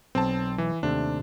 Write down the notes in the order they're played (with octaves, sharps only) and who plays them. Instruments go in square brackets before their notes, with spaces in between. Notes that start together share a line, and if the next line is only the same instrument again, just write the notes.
[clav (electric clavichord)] B1 [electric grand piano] C4 A5
[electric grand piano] E3
[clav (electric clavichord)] D#2 C3 A3 [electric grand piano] D4